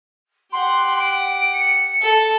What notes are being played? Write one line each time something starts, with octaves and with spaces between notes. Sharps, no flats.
G4 F#5 C6
D7
C#7
A4